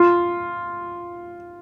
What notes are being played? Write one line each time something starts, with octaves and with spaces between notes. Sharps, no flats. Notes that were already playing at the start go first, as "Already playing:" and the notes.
Already playing: F4